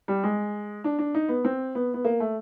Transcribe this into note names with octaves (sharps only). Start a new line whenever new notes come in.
G3
G#3
D4
D4
D#4
B3
C4
B3
B3
A#3
A3